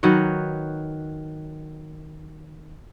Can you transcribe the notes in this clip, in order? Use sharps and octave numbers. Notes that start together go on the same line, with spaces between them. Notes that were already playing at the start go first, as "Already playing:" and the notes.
D#3 F#3 B4 C#5